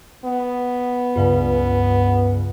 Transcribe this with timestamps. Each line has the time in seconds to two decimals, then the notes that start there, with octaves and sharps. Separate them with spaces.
0.25 B3
1.16 C#2 G2 C#3